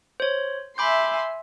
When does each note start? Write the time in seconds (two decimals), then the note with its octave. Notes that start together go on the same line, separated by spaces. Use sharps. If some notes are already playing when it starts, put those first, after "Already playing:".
0.20 C5 C#5
0.78 E5 G#5 B5 C6 D6 G6